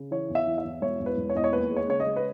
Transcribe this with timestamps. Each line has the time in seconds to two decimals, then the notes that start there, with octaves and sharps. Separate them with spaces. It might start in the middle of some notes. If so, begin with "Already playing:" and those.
Already playing: C#3
0.11 E3 C#5
0.30 E2
0.35 E5
0.47 E3
0.58 E5
0.65 E2
0.82 E1 C#5
1.00 E2
1.06 B4
1.17 E1
1.30 C#5
1.35 E2 D#5
1.44 C#5
1.53 D#2 B4
1.70 G#3
1.76 C#5
1.88 C#3 C#5
2.00 D#5
2.06 G#3
2.16 B4